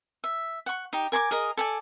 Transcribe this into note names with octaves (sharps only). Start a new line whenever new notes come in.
E5
F#5 C#6
D#4 G4
A#4 G#5 C#6 D6
G#4 A#4 D#5
A4 D5 G#5